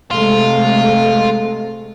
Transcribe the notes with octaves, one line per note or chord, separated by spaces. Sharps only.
C3 G#3 A3 F4